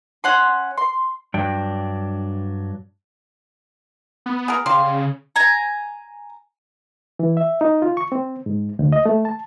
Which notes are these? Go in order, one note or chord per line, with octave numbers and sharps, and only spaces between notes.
C#4 F#5 C6
C6
G2 F#3 D4 G5
B3
G#4 A#4
C#3 G3 F5 C6
G#5 A#5
E3
E5
D#4
F4
C#6
C4
G#2
D2
D#5
A3
A5